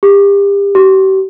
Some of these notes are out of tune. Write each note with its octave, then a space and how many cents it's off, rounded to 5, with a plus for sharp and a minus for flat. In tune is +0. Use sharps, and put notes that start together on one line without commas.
G4 +35
G4 -40